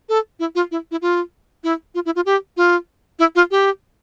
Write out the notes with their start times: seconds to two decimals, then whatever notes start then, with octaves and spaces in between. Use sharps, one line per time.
0.09 A4
0.40 E4
0.55 F4
0.71 E4
0.91 E4
1.02 F4
1.64 E4
1.95 F4
2.06 E4
2.16 F4
2.26 G4
2.57 F4
3.19 E4
3.35 F4
3.51 G4